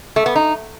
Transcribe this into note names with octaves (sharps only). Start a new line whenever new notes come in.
A3
B3
D#4